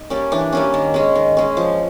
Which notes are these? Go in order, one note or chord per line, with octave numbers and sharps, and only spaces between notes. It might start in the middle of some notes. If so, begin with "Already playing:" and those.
Already playing: D#4
G3 A#3 C#4
E3 D4
G3 A#3 C#4
D#3
G#3 C#4
D#3
G#3 C#4
F3